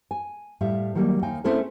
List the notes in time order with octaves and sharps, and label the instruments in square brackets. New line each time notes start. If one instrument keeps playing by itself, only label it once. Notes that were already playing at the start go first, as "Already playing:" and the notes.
[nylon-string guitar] G#5
A2 G3 E5 F5
D#3 F#3 G3 A#3
D#2 D#4 F5 G5 G#5
A3 C4 C#4 E4 G#4 A4